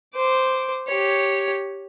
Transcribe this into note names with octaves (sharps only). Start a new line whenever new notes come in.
C5 D6
G4 C#5